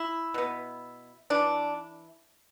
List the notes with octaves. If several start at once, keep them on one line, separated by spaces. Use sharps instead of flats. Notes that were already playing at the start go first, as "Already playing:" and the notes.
Already playing: E4
B2 B3
E3 D4